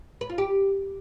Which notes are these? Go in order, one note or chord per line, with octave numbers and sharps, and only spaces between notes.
B4
F4
G4